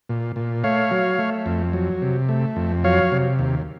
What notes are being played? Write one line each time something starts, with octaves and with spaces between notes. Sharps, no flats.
A#2
A#2
A3 C#5 F5
F#3
A3
F2
F#3
C3
A3
F2
F#3 C#5 F5
C3
D#2